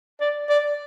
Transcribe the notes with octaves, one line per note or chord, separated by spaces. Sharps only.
D5
D5